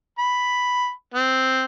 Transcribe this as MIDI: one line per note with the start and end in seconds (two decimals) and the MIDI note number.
0.19 0.90 83
1.14 1.65 60